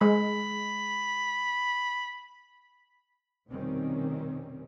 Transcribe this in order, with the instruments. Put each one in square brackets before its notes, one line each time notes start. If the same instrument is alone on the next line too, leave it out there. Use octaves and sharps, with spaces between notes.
[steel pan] G#3 [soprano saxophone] B5
[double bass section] F1 B2 D#3 G3 C4 C#4